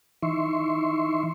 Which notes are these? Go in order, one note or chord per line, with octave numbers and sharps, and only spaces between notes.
E3 D#4 E5 C6 C#6